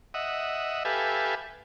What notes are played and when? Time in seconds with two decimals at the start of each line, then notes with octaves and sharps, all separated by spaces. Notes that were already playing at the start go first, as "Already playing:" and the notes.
0.14 D#5 E5 F#5
0.85 G4 A4 B4 E5 F5 G#5